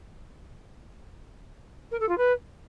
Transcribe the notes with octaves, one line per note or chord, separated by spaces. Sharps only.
A#4
A4
F4
B4